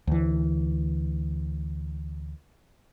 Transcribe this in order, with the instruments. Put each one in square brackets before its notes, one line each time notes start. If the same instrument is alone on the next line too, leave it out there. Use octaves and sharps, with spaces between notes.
[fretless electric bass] D2 E3